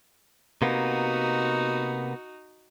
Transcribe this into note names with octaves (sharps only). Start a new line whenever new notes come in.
C3 A#3 B3 D#4 F#4